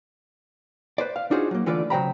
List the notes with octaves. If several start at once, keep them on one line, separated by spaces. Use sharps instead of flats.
B4 C5 D5
F5
D4 D#4 F4 F#4 G#4 C5
F#3 A#3
D3 E3 A3 F4 B4 D5
C#3 F#3 C5 G5 A#5 B5